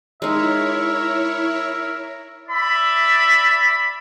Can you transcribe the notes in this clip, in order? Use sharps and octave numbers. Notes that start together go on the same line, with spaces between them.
G#3 D#4 E4 A#4 C#5 E5
D5 E5 B5